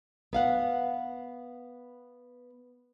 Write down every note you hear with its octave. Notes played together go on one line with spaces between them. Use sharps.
B3 F5 F#5